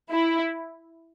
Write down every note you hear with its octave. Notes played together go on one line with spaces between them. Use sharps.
E4